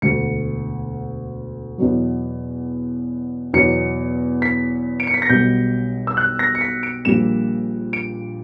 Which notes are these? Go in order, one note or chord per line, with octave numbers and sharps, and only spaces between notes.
E1 D2 D3 C#7
E2 B2 F#3
E2 B2 F#3 C#7
B6
D7
C#7
B6
A#6
B1 B2 G3 G6
E6
F#6
A#6
C#7
B6
D7
A#1 A#2 G3 E7
D7